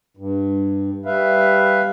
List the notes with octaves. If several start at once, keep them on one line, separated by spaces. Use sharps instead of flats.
G2
G3 B4 E5 F5